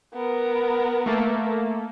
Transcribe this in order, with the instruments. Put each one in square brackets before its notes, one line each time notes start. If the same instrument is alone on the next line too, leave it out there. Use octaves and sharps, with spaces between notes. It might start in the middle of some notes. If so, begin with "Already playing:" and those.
[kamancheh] B3 A#4
[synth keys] A3 A#3 A4